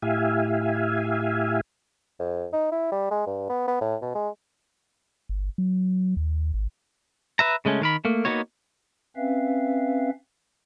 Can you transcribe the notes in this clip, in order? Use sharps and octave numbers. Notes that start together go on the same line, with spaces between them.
A2 E4 G4 E5 F5 G#5
F2
D#4
E4
G3
G#3
G2
B3
B3
A2
B2
G#3
G1
F#3
D#2
G#1
B4 E5 A#5
C#3 G#3 A3 C#4
D#3 A#4 B5
A3 A#3
A#3 B3 D#4 F#4 C#5
C4 C#4 B4 E5 F5